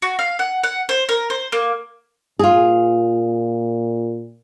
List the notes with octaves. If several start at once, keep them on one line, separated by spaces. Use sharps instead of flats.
F#4
F5
F#5
F#5
C5
A#4
C5
A#3
A#2 F4 G#4